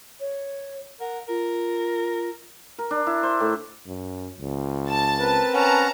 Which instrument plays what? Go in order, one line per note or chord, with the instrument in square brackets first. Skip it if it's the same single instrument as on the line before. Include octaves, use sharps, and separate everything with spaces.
[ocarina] C#5
[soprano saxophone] A#4 [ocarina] F#5
[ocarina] F4 [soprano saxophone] A#4
[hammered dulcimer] A#4
D4
E4
C5
A2
[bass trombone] F#2
C#2
[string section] A5 A6
[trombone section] C4 A#4 B4
[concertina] C#4 F#5 [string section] A5 A#5